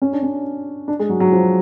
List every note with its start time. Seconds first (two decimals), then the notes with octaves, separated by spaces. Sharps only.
0.02 C#4
0.13 D4
0.23 C#4
0.88 D4
0.99 G#3
1.09 F#3
1.20 F#3
1.32 F3